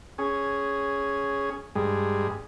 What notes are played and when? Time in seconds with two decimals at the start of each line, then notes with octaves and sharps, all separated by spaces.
0.18 C#4 G#4
1.75 G2 G#3